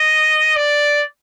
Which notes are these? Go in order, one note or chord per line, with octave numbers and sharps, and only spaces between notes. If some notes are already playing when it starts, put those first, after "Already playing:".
Already playing: D#5
D5